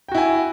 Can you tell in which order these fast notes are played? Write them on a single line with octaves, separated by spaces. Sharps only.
G5 F#4 E4 G#5